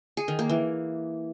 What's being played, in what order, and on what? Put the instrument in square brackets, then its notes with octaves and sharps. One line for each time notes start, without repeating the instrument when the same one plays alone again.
[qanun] G#4
D#3
A#3
E3